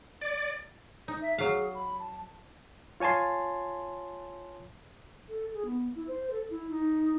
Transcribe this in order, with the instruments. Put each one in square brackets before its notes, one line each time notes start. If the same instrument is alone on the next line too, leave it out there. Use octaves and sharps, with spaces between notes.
[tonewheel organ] D5
[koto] D#4
[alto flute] E5
[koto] F#3 F5 [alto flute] G#4
[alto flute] B5
A5
[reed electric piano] F4 C#5 G#5 A5 C6
[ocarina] A4
G#4
B3
E4
C5
A4
E4
D#4